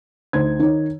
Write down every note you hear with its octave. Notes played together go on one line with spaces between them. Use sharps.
D2 D#4 C5 G#6
D#3 D#4 C#5